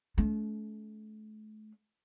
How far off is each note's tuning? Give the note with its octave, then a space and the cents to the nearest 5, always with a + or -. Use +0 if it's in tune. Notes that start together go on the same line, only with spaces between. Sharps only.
A3 -35 C#4 +40